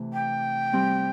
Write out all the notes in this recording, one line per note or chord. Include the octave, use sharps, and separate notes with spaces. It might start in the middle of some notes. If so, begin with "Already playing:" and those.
Already playing: C3 E3 A3
G5
G3 C4